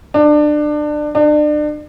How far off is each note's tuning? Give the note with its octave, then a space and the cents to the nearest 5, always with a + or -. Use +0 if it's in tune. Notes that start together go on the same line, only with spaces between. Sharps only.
D4 +25
D4 +35